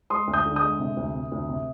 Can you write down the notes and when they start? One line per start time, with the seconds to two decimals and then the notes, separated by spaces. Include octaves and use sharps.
0.10 G#3 C6 D#6
0.27 D2
0.34 D#6 G6
0.46 D3
0.56 D#6 G6
0.62 G#3
0.80 C3
0.97 D2
1.15 C3
1.32 D2
1.49 C3